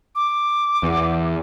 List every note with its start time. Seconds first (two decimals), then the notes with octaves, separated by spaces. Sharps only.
0.15 D6
0.83 E2